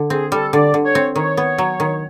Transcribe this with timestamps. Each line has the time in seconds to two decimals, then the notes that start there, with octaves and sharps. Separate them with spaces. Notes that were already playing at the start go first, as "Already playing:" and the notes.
Already playing: D3
0.10 C4 G#4
0.32 G3 A4
0.52 D3 D5
0.74 D3
0.84 C#5
0.95 C4
1.16 D#3 C#5
1.37 B3
1.58 F#3
1.80 D#3